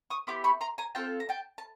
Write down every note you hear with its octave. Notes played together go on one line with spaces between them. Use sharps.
C#6 D#6
B3 E4 G4 C6 D6
B5 C#6
A#5 C6
G#5 A#5
C4 F4 A4 G5 A5
A#5
G5 A5
A5